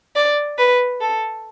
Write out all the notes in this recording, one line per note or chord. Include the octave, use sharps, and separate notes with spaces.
D5
B4
A4